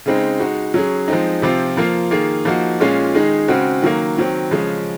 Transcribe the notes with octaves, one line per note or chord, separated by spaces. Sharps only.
C#3 G#3 C4 D#4
G#3 D#4 F#4
F#3 C#4 G#4
F3 G#3 C4 D#4
C3 F3 C4 F4
F3 A#3 F4
D#3 A#3 F4 G#4
F3 A#3 D#4 F#4
A#2 G#3 C#4 F4
D#3 G#3 D#4 G#4
C#3 G#3 C4 F#4
D#3 F#3 A#3
D#3 F#3 C4
C#3 F3 G#3 C#4